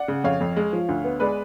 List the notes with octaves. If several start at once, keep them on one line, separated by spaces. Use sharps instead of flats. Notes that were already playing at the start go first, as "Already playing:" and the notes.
Already playing: D5 F#5
C#3
F2 C#5 F5
F2
G#3
F3
D2
B3
G#3 B4 D5